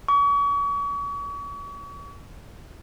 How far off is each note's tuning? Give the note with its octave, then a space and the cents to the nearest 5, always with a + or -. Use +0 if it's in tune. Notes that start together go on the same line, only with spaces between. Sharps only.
C#6 +40